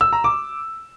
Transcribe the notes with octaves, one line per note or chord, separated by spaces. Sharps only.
E6
A#5
D6